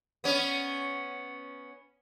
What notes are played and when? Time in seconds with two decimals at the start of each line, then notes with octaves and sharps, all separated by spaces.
0.24 B3 C#4